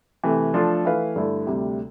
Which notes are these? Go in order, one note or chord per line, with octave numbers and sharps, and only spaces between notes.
C3 E3 A3
F3 A3 D4 F4 A4
E3 A3 E4 B4 F5
G2 D3 A3 E4
D2 C3 G3